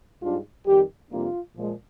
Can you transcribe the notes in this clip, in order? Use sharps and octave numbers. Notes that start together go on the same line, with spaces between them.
G#2 G3 D4 F4
F2 D#3 G3 G4
F2 C3 G3 A#3 D4 F4
A#2 F3 G#3